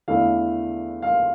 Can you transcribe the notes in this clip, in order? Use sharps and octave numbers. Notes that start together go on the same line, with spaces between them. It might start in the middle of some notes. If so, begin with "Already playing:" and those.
E2 D3 A3 E4 F5
F5